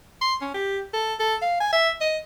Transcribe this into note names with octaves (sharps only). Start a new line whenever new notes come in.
C6
C#4
G4
A4
A4
F5
G#5
E5
D#5